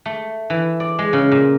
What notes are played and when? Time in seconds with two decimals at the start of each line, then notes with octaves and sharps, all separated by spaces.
0.06 A3
0.50 E3
0.80 D5
0.99 G#3
1.13 C#3
1.32 A#2